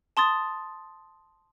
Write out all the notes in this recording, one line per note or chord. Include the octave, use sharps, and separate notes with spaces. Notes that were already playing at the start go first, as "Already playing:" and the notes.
A5 C6 D#6 A6